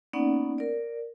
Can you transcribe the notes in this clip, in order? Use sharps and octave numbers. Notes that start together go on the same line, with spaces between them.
A#3 B3 C#4 D#4 D5 F#5
A#4 D5